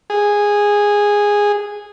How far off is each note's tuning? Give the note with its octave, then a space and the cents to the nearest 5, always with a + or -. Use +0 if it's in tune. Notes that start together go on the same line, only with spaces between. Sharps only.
G#4 -10